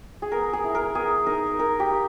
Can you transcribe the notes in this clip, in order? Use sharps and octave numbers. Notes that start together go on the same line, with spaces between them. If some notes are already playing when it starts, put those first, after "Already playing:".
G#4
B3 A#4
G#4
E4
A#4
B3 G#4
D#4 A#4
D#4 A#4
G4
A#3